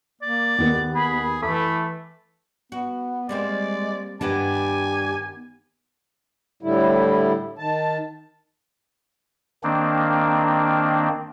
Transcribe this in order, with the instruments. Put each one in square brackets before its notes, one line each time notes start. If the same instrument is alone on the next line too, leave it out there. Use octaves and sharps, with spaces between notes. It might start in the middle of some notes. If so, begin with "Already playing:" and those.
[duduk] A#3 [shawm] D5
[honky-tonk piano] D#2 D#3 A#3 [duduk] B3
[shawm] G#4 [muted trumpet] B5
[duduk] E3 [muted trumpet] A3 [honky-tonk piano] A4 D6 E6 [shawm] B5
[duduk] B3 [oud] F#4
[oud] G3 A#3 C4 [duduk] G#3 [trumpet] D5
[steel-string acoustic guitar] G2 D4 [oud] D#3 B3 B4 [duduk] G4 [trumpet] G#5
[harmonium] A2 D3 G3 E4
D#3 A5
[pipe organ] D#3 A#3 C4 D4